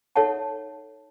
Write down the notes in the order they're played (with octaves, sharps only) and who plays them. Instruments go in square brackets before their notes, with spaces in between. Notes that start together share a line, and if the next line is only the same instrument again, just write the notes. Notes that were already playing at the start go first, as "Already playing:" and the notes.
[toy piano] D#4 A4 C#5 E5 F#5 A5